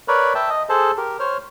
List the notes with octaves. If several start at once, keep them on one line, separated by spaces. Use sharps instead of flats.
A#4 B4 C#5 D5 B5
E5 G5 A5
D#5
G#4 A4 C5 A5
G4 A#4
C5 C#5 F6